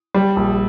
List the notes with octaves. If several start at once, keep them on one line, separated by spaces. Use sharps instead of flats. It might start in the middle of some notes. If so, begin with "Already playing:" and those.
G3
A#1